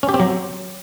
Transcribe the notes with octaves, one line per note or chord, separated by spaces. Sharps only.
C#4
G4
C4
F#3